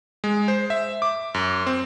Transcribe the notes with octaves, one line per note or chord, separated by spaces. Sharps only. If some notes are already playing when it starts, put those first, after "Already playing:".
G#3
C5
E5
D6
F#2
C4